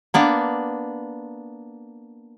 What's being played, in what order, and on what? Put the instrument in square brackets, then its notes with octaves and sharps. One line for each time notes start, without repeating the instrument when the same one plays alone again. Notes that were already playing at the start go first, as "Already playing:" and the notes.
[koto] A#3 B3 D4